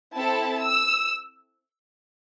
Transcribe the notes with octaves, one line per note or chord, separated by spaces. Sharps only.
C4 E4 A4 A5
E6